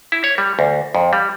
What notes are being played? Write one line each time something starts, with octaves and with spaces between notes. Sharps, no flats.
E4
C#5
G3
D2
F2
G3